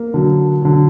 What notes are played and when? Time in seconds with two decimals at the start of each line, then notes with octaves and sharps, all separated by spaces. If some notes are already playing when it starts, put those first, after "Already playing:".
Already playing: A#3
0.14 D3 F#3
0.62 D3 F#3